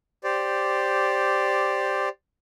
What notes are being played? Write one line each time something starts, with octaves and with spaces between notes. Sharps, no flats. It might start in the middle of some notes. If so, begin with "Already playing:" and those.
G4 C5 D5